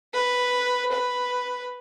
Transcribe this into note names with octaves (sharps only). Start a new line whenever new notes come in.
B4
B4